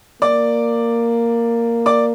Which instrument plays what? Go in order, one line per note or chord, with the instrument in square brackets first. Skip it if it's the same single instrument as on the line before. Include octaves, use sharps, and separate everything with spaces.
[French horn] A#3 [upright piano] D5 D6
[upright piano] D5 D6